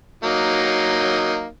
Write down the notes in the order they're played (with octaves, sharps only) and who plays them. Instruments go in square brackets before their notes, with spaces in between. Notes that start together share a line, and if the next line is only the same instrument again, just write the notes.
[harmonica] F#3 A#3 D#4